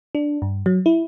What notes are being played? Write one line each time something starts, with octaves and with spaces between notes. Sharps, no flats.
D4
G2
F#3
E4